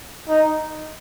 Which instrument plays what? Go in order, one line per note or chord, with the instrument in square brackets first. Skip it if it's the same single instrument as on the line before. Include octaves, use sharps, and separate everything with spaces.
[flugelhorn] D#4